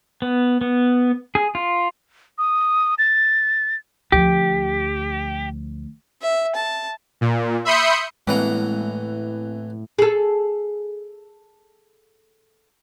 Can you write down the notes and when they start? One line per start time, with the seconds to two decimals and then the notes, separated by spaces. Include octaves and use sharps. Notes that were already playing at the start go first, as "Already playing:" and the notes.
0.22 B3
0.61 B3
1.35 G#4
1.55 F4
2.38 D#6
2.98 A6
4.12 D2 F3 G4
6.22 E5
6.55 A5
7.21 A#2
7.65 E5 B5 C6 D#6 G6 C#7
8.27 A2 E3 G#3 A#3 C4 F#5 A#5
9.99 G#4 A4